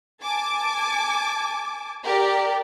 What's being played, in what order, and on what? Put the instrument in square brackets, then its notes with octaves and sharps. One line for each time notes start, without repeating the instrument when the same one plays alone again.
[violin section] G#5 A5 D6
G4 A#4 D5